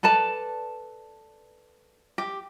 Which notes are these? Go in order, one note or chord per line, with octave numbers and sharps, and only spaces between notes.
A4 B4 D5 A5
G4